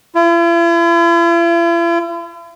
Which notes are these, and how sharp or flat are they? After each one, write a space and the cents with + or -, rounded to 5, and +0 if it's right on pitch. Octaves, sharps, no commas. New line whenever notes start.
E4 +45